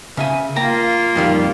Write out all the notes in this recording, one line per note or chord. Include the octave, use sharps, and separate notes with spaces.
C#3 E5 G#5
A#3 F4 G5 A#5
F2 D#3 G3